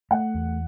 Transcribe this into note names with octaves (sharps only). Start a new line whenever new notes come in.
A3 F#5
E2